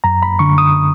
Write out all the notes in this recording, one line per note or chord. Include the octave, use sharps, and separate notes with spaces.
F#2 A#5
B5
D3 C#6
D#6